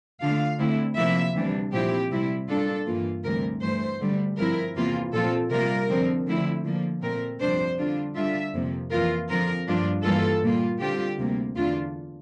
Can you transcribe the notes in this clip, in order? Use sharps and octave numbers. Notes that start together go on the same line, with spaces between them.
D3 A3 D4 F4 F5
D3 A3 C4 E4
C3 F3 A#3 E4 E5
D2 C3 E3 G3 D4
A#2 F3 C4 E4 G4
C3 G3 C4 E4
A#2 G3 D4 F4 A4
G2 E3 A#3 F4
D2 C3 E3 G3 A#4
G2 E3 A3 C5
D2 D3 G3
G2 F3 C4 E4 A#4
E2 C3 E3 A#3 F4
A#2 F3 C4 F4 A4
C3 G3 A#3 F4 A#4
F2 D3 F3 C4
D3 F3 A3 C4 E4
D3 F3 A#3
A#2 A3 C4 A#4
F2 C3 G3 D4 C5
D3 G3 D4 F4
D3 G3 D4 F4 E5
F2 C3 F3 A#3
F2 E3 A#3 F4 A#4
D3 F3 C4 F4 A#4
G2 F3 A#3 D4 F4
G2 E3 G3 A#3 F4 A4
A#2 G3 A#3 F4
D3 G3 C4 F4 G4
D2 C3 G3 A#3
E2 D3 A3 D4 F4